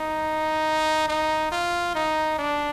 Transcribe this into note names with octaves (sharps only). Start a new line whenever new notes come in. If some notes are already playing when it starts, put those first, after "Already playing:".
Already playing: D#4
D#4
F4
D#4
D4